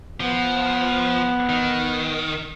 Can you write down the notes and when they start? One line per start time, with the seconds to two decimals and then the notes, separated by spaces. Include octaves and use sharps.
0.20 F3 B3
1.49 D#3